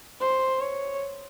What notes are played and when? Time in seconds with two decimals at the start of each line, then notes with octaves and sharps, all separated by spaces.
0.21 C5
0.61 C#5